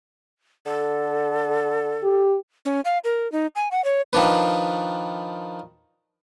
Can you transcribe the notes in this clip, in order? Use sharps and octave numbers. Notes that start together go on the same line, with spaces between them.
D3 A4
G4
C#4
F5
A#4
D#4
G#5
F#5
C#5
D#3 F3 D4 B4